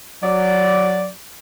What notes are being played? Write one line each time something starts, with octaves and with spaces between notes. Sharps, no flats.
F#3 D5